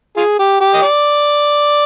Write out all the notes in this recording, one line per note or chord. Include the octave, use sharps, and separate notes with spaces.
F4 G#4
G4
G4
D#5
D5